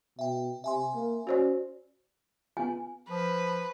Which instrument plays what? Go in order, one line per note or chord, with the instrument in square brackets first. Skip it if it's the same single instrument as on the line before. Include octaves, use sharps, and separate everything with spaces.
[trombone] B2 [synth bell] E5 G5
[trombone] C3 [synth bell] E5 G#5 C6
[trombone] A#3
[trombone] C#4 [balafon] F#4 C5 D5
[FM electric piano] B3 F4 [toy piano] G#5
[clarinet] F3 [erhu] B4